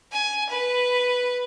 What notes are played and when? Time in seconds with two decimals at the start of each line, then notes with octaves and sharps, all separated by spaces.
0.12 G#5
0.49 B4